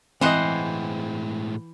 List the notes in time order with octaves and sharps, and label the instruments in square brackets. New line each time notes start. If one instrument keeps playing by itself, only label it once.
[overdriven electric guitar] A2 G#3 [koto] E3 C5 F#5 [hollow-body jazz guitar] C4 D#5